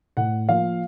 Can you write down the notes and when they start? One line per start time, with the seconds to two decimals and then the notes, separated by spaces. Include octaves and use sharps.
0.17 A2 F#5
0.48 F3 A#3 F5